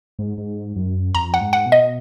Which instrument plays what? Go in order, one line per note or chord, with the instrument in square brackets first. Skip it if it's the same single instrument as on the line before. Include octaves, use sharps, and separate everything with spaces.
[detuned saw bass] G#2
G#2
F#2
[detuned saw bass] F2 [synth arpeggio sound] A#5
[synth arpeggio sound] F#5
[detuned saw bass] G#2
[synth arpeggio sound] F#5
[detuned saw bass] B2
[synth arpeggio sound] D#5